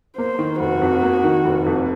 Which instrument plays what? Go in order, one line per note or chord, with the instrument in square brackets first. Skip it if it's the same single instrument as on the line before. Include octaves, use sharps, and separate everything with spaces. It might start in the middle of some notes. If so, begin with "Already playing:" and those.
[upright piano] A#3 [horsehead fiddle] C5
[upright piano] D#3
[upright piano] F1 [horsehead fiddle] F#4
[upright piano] F2
A#3
D#3
F1
F2